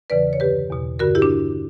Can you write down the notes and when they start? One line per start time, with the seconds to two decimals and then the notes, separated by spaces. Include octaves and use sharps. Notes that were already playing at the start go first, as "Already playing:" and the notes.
0.10 E2 C#3 E3 B4 D5
0.33 C#5
0.40 G2 D3 G4 B4
0.70 E2 B2
0.99 G2 D3 F#4 A#4
1.15 E4 G4
1.22 D4